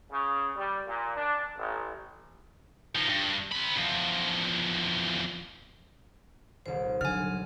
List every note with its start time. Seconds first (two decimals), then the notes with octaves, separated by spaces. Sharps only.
0.11 C#3
0.56 G3
0.87 A#2
1.17 D4
1.57 A1
2.95 F3 D#4
3.07 G2
3.52 C4 B5
3.77 E2 F3
6.66 D#1 C2 C5
7.01 D3 F#3 G#5 F6